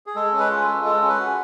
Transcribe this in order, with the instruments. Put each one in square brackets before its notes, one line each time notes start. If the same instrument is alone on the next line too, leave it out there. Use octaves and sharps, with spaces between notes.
[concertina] G#4
G#3 A4
C#4
B4
F4
A4
G#3
G#3 A4
C#4
B4
F#4